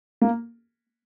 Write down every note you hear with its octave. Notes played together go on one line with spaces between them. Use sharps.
A#3